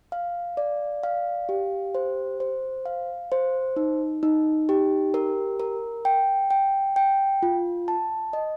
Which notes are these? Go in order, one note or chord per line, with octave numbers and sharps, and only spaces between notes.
F5
D5
F5
G4
C5
C5
F5
C5
D#4
D#4
G4
A#4
A#4
G5
G5
G5
F4
A5
D#5